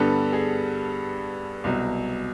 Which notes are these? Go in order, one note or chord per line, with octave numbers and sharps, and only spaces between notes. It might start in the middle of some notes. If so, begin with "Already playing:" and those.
Already playing: G2 D3 G3 B3 A4
G#4
C2 B2 F#3